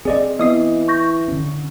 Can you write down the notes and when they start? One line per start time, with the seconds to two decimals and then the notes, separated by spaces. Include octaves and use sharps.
0.05 C4 G#4 D5 D#5
0.39 E3 B3 D#5 D#6 C7
0.88 C#6 G6 A#6
1.28 D3 C#4